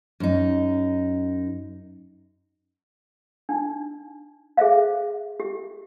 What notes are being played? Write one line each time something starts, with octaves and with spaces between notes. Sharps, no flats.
F#2 D#4
D4 D#4
G#4 C5 E5 F5
G4